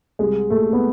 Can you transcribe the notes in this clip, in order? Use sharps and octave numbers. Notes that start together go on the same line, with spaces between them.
C2 G#3
A#2 A3
B3